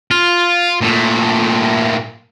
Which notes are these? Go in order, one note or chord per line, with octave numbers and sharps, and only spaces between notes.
F4
A#2 A3